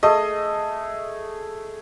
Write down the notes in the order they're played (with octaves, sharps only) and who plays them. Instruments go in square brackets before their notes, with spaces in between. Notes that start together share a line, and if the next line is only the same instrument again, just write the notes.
[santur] A3 G#4 [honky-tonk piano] D#5